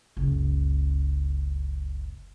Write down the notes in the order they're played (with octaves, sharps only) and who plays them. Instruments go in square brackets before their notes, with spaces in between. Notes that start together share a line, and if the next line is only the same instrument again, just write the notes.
[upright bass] F#1 C#2